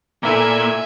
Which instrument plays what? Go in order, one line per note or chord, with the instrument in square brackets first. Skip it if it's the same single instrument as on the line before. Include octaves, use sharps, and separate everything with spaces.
[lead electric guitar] A#2 [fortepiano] A#3 E4 A4 [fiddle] E5 G#5